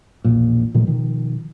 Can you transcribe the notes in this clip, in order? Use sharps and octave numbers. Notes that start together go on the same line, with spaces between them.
E1 A#1 A#2
A#2 D#3 F3 A3
B2 D#3 F3